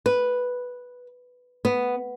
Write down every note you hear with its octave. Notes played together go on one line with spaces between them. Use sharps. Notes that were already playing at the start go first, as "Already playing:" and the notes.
B4
B3